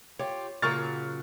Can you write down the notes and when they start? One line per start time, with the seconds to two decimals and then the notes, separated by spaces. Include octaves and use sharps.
0.19 F4 G4 C#5
0.62 A#2 C#3 F#3 A#3 C#4 C#6 F6 A6